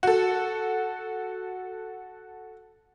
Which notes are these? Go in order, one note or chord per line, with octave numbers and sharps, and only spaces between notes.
F#4 A4